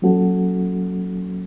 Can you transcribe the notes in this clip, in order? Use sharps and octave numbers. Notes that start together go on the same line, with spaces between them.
F#3 A#3 C#4 F#4 A4